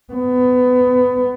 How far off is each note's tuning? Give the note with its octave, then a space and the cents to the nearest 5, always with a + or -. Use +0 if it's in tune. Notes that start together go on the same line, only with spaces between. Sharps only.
B3 +20